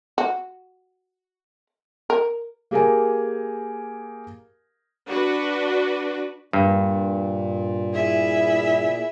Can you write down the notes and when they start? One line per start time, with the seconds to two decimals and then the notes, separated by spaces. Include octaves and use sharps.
0.18 F#4
2.10 A#4
2.71 A#3 G4 G#4 A#4 F5 G#5
5.08 D4 F#4 B4
6.53 G2 A#2
7.93 E4 G#4 E5